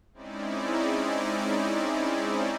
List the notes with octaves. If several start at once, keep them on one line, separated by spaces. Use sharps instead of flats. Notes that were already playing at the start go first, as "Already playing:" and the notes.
G#3 C4 C#4 D#4 E4 D5